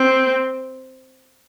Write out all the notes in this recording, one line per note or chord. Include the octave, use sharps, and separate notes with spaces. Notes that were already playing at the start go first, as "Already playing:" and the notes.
Already playing: C4